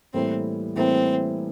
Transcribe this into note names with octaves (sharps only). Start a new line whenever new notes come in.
A2 E3 G3 A#3 C4 E4
A2 E3 G3 A#3 C4 E4